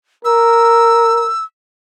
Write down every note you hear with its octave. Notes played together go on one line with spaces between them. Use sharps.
A#4 E6